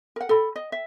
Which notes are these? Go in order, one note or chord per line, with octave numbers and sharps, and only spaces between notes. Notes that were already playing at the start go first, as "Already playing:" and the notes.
A#4 F#5
A4 B5
D#5
E5